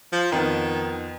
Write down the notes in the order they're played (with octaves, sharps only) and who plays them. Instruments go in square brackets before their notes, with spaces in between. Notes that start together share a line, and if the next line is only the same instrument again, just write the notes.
[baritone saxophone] F3
[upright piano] F2 F3 B3 [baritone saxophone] D#3